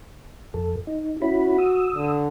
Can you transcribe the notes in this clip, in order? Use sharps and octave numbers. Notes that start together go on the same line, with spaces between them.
F2 A4
D#4
C#4 E4 F#4 B5
D#6 E6
D3